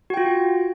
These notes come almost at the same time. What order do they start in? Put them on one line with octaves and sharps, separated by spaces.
F#4 G5 F4